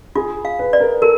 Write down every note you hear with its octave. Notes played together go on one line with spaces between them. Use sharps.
F4 G#4
F5
B4
D5
A#4
A4 A#4